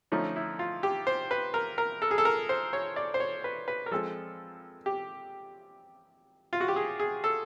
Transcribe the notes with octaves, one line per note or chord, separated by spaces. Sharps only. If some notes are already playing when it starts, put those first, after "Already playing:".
D3 F3 A3 C#4 D#4
E4
F4
G4
C5
B4
A#4
A#4
A4
G#4
A4
A#4
C5
C#5
D5
C5
C#5
B4
B4
A#4
F3 G#3 C4 A4
G4
F4
F#4
G4
G#4
G#4
A4